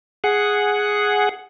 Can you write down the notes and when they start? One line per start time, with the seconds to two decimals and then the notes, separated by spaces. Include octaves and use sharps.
0.24 G#4 F#5